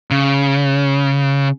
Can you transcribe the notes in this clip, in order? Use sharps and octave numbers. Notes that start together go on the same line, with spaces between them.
C#3